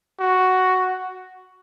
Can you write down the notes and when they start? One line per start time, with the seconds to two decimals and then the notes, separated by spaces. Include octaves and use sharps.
0.20 F#4